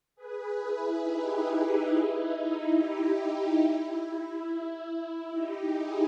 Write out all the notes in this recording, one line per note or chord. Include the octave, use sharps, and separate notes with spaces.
G#4 B4
E4 G#4
D#4 G4
E4
D#4
E4
D#4
E4
D#4 G4
D#4
E4
D#4 G4
E4 G#4